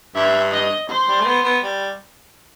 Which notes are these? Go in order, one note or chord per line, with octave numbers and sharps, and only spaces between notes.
G2 E5
D#5
C5
G3
A3
B3
B3
G3